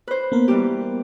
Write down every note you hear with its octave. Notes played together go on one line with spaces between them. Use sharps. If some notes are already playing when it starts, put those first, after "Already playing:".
B4 C5
A#3 B3 A#4
E3 G3 G4